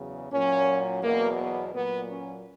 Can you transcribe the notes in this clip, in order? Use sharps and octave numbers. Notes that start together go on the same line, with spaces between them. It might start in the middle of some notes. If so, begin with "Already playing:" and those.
Already playing: E2 C#3 F#3
A#2 F#3 C#4
E2 B2 F#3 A#3
B3
A#2 F#3 B3
C#4